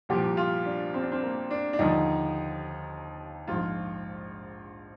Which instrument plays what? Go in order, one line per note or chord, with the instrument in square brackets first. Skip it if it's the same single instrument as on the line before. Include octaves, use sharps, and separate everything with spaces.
[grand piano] C2 A#2 F3 G4
F4
D4
C4
D4
C4
A#3
D4
D4
D#2 D3 F3 D#4
A#1 G#2 F3 F4